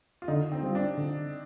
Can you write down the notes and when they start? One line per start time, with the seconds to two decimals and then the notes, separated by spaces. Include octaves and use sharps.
0.22 F4
0.28 D3 D#4
0.52 C4
0.63 G3 C4 F4
0.75 D4
0.98 D3